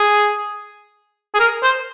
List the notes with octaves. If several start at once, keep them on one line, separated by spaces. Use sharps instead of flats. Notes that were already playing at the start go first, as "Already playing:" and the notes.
Already playing: G#4
G#4
A#4
C5